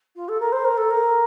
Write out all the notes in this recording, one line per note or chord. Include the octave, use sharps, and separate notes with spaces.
F4
A4
A#4
C5
A#4
A4
A#4